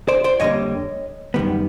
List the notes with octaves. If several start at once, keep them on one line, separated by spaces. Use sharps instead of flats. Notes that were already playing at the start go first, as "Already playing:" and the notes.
C5 D5
C5 D5
F2 D3 G3 A#3 C#5 D#5
F#2 D#3 G3 B3